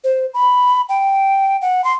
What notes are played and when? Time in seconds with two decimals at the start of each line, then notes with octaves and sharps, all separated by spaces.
0.04 C5
0.34 B5
0.89 G5
1.62 F#5
1.84 C6